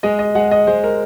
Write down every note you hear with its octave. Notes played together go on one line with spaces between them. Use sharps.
G#3 D#5
D#5
G#3 F#5
D#5
G#3 C5
A#4